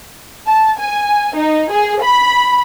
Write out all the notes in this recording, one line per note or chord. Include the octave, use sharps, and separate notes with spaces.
A5
G#5
D#4
G#4
B5